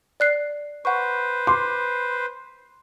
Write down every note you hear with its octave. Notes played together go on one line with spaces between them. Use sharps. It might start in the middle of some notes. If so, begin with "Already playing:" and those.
D5 F#6 C7
B4 C5 F#5 C#6
C6 D6